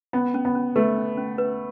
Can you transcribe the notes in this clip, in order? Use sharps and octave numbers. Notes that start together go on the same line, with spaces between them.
B3 C#4
C#4
B3
C#4
A3 B4
C#4
C#4
B4